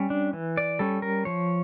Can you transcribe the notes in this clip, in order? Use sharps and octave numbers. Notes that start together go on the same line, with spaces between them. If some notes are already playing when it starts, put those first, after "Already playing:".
Already playing: G3 C#4
D4
E3
D5
G3 C#4 A4
A#4
F3 C#5